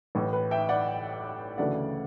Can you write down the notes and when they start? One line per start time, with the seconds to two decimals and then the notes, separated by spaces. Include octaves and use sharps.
0.15 A1 A2 E3
0.33 B4
0.51 E5 G5
0.69 D5 F#5
1.58 D2 C#3 E3 A3 D5 F#5